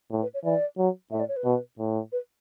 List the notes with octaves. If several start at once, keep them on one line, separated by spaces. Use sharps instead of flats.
A2
B4
C#5
E3 D5
F#3
A2 E5
D5
C#5
B4
B2
A2
B4